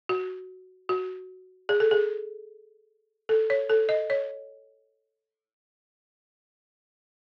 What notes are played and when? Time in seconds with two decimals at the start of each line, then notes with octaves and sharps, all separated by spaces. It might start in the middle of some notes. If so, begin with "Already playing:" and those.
0.09 F#4
0.89 F#4
1.69 G#4
1.80 A4
1.91 G#4
3.29 A4
3.50 C#5
3.69 A4
3.89 D#5
4.10 C#5